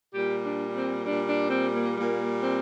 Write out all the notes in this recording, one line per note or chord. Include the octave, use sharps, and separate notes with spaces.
A#2 G3 G4
D4
C4
A#2 G3 D4
D4
C4
A#3
A#2 G3 A#3
C4